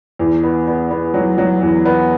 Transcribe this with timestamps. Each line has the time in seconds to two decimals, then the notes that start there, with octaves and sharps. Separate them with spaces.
0.19 E2
0.43 B3
0.67 B3
0.90 B3
1.14 F#3
1.38 F#3
1.62 E2
1.85 B3